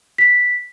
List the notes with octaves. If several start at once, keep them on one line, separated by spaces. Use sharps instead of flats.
B6